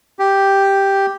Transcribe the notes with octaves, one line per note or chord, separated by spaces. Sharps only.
G4